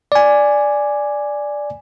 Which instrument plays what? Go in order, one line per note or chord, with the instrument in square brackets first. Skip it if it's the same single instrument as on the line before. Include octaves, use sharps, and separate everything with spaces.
[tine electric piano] D5 G#5